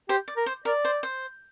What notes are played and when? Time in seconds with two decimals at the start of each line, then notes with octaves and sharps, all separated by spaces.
0.09 G4 C5
0.28 D5
0.37 A#4
0.46 C5
0.65 A#4 D5
0.85 C5
1.03 C5